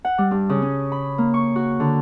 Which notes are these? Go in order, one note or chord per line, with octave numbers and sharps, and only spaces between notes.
F#5
G3
G2
C#3
C#4
B5
A#3
C#6
F#4
D3